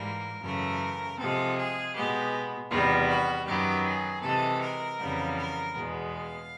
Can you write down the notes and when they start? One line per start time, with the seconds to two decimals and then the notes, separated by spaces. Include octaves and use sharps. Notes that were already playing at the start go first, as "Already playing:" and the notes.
Already playing: G#2 E3 G3 A#3 A#4
0.43 F#2 C#3 E3 A3 A#4
1.18 C3 F3 G#3 A4
1.57 G#4
1.95 B2 G#3 B3 G4
2.70 E2 C3 D#3 G3 B3 F4
3.08 F#4
3.46 F#2 D#3 F#3 B3 G4
3.84 G#4
4.22 C3 E3 G#3 A4
4.61 A#4
4.98 F2 C#3 E3 G3 B3
5.36 A#4
5.75 E2 B2 G#3 B3
6.12 F5